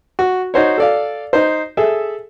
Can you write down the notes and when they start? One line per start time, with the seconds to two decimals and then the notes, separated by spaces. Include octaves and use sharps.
0.19 F#4
0.54 D#4 F#4 C5 C#5
0.78 A4 D5 F5
1.33 D#4 C5
1.77 G#4 A4 E5